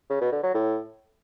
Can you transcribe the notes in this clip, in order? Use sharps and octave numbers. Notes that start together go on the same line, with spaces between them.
C#3
B2
D3
F#3
A2